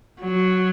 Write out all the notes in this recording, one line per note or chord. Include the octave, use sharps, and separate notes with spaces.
F#3